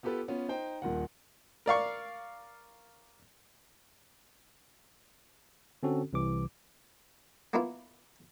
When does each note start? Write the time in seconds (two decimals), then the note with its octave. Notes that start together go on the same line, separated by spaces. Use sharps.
0.03 B3 F4 G4 A4 B4
0.28 B3 C#4 F4
0.49 D#4 C5 G5
0.82 D#1 A#2 D#3 F#5
1.66 A#4 D5 F5 C#6
5.83 D3 C4 C#4 F#4 A4
6.13 C2 C3 E3 D6
7.53 A#3 B3 D4 E4 F4